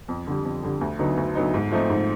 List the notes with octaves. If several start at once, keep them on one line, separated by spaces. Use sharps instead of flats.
F2
D3 G3
F2
D3 G3
D2
D3 F#3 B3 D#4
D2
D3 F#3 B3 D#4
G#2
F3 A3 C4 D#4
G#2